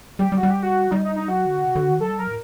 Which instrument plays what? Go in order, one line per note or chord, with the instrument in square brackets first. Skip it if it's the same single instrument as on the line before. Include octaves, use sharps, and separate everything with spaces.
[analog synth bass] G3 [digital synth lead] G4
[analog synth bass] G3
[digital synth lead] F#4
[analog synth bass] G3
[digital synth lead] G4
F#4
[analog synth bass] G3 [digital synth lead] D#4
[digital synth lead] D#4
D#4
[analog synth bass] F#3 [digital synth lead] F#4
[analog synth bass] D3
C3
D3
D#3
[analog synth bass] F#3 [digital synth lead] A4
[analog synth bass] G3
[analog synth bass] F#3 [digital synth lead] A#4
[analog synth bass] A2